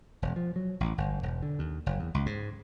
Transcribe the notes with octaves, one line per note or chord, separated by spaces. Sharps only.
E1
F3
F#3
A1
G1
E1
D3
D#2
F#1
E2
C#2
G#2